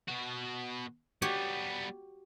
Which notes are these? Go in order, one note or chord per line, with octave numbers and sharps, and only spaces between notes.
B2 F#4
G3 B3 F#4 G4 C#5